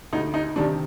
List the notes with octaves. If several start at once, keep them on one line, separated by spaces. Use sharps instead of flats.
D2 D#4
D#4
C3 D#3 D4